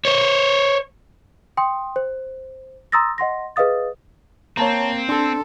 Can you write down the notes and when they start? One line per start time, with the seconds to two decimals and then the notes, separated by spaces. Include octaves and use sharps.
0.05 C5 C#5
1.57 G5 C6 D#6
1.96 C5
2.92 A#5 C6 D#6 E6 A6 A#6
3.18 D#5 F#5 C6 A#6
3.56 G#4 B4 D#5 F5 D#6 A6
4.57 A#3 C4 C#5 A5 A#5
5.09 D4 A4 C6